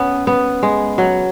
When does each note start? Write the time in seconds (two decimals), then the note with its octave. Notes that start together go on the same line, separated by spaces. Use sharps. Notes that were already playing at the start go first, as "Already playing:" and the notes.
Already playing: B3 C#4
0.27 B3
0.63 G#3
0.98 F#3